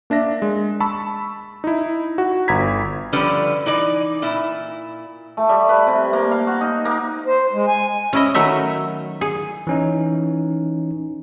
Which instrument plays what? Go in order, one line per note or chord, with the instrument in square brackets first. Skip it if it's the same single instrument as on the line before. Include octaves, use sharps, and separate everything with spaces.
[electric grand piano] A#3 D4 E5 A#6
G#3
A5 B5 C#6 E6
D#4 E4
F#4
G1 A#5 B5 G#6 B6
[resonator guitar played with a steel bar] D3 F3 G3 C#4 B4
E3 D#4 D5
A#2 E4
[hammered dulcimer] A3
G3
B4
C3
A#3
F5
F#4
D#4
A#3
[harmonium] C5
G#3
G#5
[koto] C#4 E4 D#5
D#3 F#3 A3 E5
G#4
[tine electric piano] E3 C#4 D#4